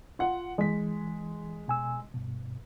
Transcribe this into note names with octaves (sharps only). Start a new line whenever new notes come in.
F4 F#5
E3 G#3 B6
B2 G#5 E6
G2 B2